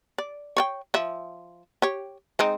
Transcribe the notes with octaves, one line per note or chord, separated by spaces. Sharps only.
D5
C#5 D5 G5
F3 E5
G4 C#5
G#3 C4 D#4